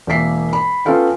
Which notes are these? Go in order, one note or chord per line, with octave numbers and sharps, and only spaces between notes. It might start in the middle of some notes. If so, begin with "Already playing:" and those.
E1 A#3 E5 B6 C7
B5
B3 C#4 F4 A4 F5 G5